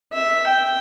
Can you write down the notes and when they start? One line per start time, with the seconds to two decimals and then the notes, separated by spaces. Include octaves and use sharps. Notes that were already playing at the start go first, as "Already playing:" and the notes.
0.13 E5
0.47 G5